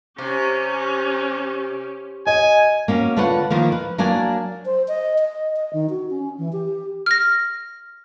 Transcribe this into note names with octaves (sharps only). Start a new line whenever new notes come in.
C3 C#4 G4
D#5 G#5
A#3 C#4 F#4
D3 D4 F4 B4 C#5 F#5
D#3 F3 A#3
B4
F#3 A#3 D4 D5 G#5
C5
D#5
D#5
D#5
D#3
F#4
C#4
E3
G4
F6 A#6